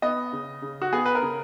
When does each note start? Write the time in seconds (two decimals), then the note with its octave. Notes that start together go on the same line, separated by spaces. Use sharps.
0.02 B3 D#5
0.33 C#3
0.62 C#3
0.82 F#4
0.93 B3 G#4
1.06 B4
1.15 A#4
1.22 C#3